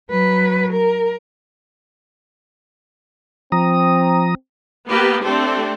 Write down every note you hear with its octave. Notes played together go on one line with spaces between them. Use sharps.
F#3 B4
A#4
F3 C4 A#5 D#6
A#3 B3 G4 B4
A3 C4 D4 G4 A4